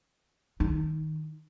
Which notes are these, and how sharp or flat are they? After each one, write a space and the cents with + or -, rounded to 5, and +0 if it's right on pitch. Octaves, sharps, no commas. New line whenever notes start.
D#3 +0 D#4 +0